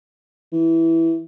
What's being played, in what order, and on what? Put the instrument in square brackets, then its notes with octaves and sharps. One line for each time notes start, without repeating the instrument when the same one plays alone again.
[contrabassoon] E3